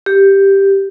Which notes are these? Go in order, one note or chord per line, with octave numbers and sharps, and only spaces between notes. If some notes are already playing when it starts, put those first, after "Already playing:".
G4